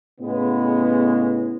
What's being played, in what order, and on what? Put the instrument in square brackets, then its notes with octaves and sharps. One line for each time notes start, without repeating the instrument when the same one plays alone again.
[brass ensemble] A2 C#3 G#3 B3